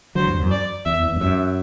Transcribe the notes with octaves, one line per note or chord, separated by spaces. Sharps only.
D3 F#3 C5
E2 G2
F#2
D5
E2 E5
E2
G2
F#2 E5